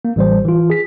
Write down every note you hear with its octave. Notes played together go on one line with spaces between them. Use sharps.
A#3
A1 G3 C5
E3 F4
G#4 B6